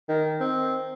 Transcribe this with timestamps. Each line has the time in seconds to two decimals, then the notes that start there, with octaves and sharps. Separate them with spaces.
0.09 D#3
0.40 C4